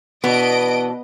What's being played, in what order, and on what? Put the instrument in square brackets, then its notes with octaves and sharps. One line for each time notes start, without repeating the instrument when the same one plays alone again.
[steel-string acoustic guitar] B2 E3 D4 [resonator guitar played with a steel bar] B3 [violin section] D#5 D7